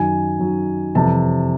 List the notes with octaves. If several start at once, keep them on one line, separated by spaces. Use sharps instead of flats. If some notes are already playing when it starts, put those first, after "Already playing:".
Already playing: F#2 D#3 F#3 G#5
F#2 D#3 F#3
F2 C3 E3 G3 A5